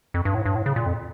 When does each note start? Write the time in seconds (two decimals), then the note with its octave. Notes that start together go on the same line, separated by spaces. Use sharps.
0.14 F2
0.25 G2
0.35 A2
0.45 G2
0.55 A2
0.66 C#3
0.76 A#2
0.86 F2